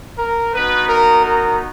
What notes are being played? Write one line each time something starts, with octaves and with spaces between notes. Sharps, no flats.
A#4
B3 D#4 F#4 B4
A#4
A#4